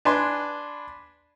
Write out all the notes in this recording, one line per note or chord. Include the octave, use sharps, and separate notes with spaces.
D4 B4 G#5 B5 C6